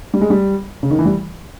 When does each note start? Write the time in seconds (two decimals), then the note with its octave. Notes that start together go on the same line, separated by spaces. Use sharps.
0.14 G3
0.21 G#3
0.30 G3
0.83 C#3
0.91 D#3
0.99 E3
1.05 G3